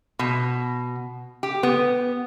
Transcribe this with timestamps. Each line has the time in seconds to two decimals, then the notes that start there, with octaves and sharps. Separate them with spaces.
0.19 B2
1.43 G4
1.63 B3